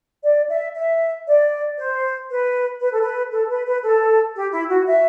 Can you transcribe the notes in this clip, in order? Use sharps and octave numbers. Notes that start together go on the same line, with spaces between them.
D5
E5
E5
D5
C5
B4
B4
A4
B4
A4
B4
B4
A4
G4
E4
F#4
E5